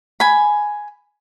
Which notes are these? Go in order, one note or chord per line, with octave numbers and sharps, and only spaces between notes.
G#5 B5